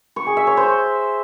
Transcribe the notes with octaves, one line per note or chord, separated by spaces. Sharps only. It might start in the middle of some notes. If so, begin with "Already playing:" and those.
C#6
G#4
E5
C#5
C5